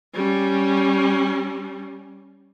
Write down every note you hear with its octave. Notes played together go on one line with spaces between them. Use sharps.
G3 C#4